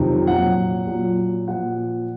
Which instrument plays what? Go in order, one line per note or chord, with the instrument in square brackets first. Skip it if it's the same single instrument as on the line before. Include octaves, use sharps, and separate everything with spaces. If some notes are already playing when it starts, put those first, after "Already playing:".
Already playing: [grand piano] F2 C3 D#3 F#3
A#2 F#3 F#5
A#2 F#3
A#2 F3 F#5